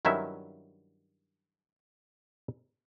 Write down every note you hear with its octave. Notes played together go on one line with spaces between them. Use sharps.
G2 D#3 F#3 C#4 E4 E5